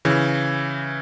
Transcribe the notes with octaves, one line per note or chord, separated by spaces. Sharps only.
C#3 E3